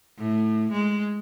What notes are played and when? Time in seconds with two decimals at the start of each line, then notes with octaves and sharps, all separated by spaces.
0.18 A2
0.72 G#3